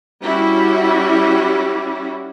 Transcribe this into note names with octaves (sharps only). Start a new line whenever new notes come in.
G3 C#4 E4 F#4